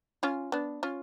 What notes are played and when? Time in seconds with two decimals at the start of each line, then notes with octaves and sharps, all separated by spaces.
0.23 C#4 F4
0.52 B3 D4
0.83 C#4 F4